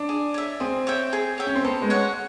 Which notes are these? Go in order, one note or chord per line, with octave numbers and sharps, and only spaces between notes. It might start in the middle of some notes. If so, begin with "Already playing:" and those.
Already playing: D4
G#4
C#5 E5
C4 G#4
C#5 E5 G5
G#4
C#5 E5 G5
C#4
C4
B3 A4
G#3
C#5 F#5